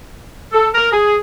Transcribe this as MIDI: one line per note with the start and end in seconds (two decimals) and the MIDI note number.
0.53 0.68 69
0.75 0.92 70
0.93 1.17 68